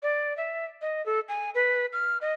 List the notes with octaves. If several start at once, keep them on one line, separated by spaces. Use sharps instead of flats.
D5
E5
D#5
A4
G#5
B4
F6
D#5